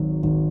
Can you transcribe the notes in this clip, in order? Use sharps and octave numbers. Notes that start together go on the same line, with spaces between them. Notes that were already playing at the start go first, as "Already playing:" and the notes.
Already playing: G#1 F#3
G#1